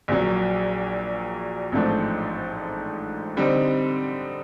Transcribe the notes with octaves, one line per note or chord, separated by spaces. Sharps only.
A#1 A#2 F#3
A1 G#2 F3 A3 D4
D3 G3 C4 D#4